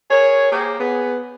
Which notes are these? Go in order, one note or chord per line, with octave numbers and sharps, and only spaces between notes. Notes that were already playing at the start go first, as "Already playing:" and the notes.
G#4 A#4 C#5
A#3 G4 G#4 C5
B3 G#4